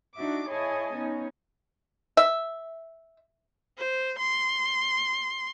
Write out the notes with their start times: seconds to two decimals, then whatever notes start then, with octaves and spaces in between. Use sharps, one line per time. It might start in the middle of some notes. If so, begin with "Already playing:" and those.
0.15 D4 D#4 F#4 E5 D6
0.48 E4 G#4 C#5 D#5 G#5 A5
0.94 B3 C#4 D#4
2.17 E5
3.78 C5
4.19 C6